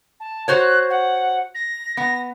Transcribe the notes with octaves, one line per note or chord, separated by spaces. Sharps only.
A5
F#4 C5 C#5 F#6
F#5
A#6
B3 A#6